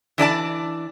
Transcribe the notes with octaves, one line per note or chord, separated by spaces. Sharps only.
E3 D4 D5 A5